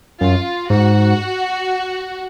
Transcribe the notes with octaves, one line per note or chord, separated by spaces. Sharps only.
F#2 F4
G#2 F#4